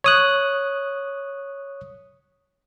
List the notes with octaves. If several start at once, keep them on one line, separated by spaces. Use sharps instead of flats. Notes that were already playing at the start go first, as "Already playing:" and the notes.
C#5 D#6 F#6